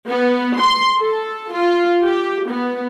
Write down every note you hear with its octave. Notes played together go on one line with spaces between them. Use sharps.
B3
C6
A4
F4
G4
B3